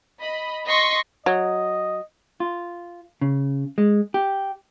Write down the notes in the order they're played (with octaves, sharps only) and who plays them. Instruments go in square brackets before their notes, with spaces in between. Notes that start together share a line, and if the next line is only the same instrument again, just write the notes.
[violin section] D#5 B5
D#5 C6 C#6 A#6 B6
[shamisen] F#3 [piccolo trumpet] D#5
[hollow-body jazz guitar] F4
C#3
G#3
G4